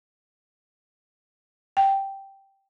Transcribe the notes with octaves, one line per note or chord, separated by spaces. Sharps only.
G5